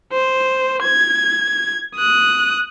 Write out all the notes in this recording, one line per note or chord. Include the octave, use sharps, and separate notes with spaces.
C5
G#6
D#6 F#6